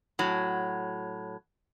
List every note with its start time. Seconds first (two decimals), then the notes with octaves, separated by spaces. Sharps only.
0.19 A2 F#3